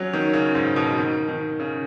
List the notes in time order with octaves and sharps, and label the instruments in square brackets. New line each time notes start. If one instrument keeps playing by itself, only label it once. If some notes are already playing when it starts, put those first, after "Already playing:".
Already playing: [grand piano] F#3 C#4
D#3
C#3
G#2
B2
D#3
D#3
C#3